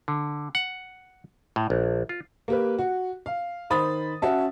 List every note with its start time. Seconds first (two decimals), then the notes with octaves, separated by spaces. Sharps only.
0.08 D3
0.55 F#5
1.56 A2
1.70 A#1
2.09 F4
2.48 A#3 G4 B4
2.79 F#4
3.26 F5
3.70 D#3 C5 B5 D#6 A6
4.22 C#4 F#4 E5 A5